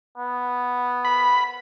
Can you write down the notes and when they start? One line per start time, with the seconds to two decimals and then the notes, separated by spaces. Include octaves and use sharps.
0.18 B3
1.05 B5